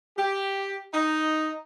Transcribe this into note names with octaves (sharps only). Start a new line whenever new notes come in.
G4
D#4